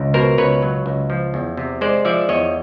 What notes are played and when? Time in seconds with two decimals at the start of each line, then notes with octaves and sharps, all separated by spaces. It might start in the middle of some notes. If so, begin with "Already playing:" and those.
Already playing: C#2
0.14 B2 A#4 C5
0.38 C#2 B4 C#5
0.63 F#3
0.86 C#2
1.10 F3
1.34 E2
1.57 C3
1.81 G#3 C5 D5
2.05 F3 D5 E5
2.29 E2 C#5 D#5